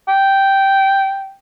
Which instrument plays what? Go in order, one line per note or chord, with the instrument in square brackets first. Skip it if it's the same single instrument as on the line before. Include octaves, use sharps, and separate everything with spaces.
[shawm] G5